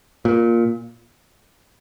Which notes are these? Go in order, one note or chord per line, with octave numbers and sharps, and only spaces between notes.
A#2